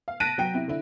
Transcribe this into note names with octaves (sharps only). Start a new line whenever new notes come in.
F5
A5 F#6 A#6 B6 D7 D#7
F#3 G5 D7
C3 E4
D3 E4